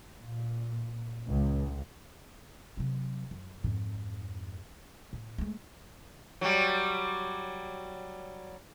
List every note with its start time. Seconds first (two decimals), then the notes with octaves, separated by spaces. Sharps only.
0.17 A#2
1.28 C#2
2.77 C3 F#3
3.31 F#2
3.64 F2 G#2
5.13 A2
5.38 G#3 A3
6.41 F#3 G3